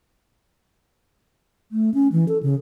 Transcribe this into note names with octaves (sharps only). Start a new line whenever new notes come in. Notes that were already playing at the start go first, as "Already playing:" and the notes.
A3
C#4
E3
A4
C#3